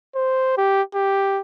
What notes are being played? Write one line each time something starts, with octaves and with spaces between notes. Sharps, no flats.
C5
G4
G4